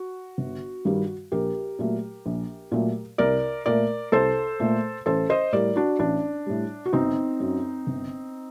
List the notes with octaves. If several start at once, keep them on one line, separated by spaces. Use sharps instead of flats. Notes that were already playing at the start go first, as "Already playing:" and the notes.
Already playing: F#4
G1
G2 D#3 G3
A#1 G4 A#4
A#2 F#3 A3
A#1
A#2 F#3 A3
C2 A#4 D5
A#2 A3 A#4 D5
C2 A4 C5
A#2 A3
A1 A4 C5
C5 D#5
A2 G3 A#4 D5
D4 F#4
A1 D4
A2 G3
F#4
G1 C4 D#4
F#2 F#3
G1